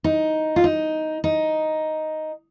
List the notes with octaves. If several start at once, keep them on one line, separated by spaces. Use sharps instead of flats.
D#4
F4
D#4
D#4